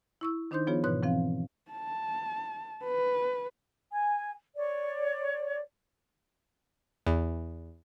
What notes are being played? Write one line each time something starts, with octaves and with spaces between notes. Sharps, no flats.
E4 C#6 E6
D#3 D4 D#4 C5 C6 G6
F3 B3 F4 G#4 C#5
G#2 B2 E3 B4 C#5 F#6
E3 F3 C4 F5
A5
B4
G#5
C#5 D5
E2